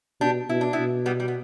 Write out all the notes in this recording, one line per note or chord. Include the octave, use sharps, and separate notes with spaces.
B2 D4 G4
B2 E4
D4
B3 E4
B2
G3 B3
G3
B3